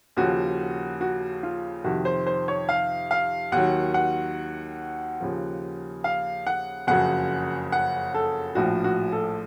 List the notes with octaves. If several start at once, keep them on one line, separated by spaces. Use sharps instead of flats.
D#2 C#3 F3 F#4
F#4
F4
F2 C3 D#3 F#4
C5
C5
C#5
F5
F5
D#2 D#3 F#3 F#5
F#5
D#2 C#3 F3
F5
F#5
F#1 F2 C#3 F#3 F#5
F#5
A4
A#1 A2 F3 F#4
F#4
A4